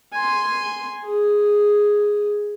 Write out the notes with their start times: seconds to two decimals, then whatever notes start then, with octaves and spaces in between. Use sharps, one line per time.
0.13 G#5 C6
1.04 G#4